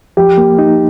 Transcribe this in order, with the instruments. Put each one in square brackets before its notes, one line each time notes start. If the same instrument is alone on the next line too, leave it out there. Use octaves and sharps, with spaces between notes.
[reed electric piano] F3 [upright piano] G4
[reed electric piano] A#3
D#4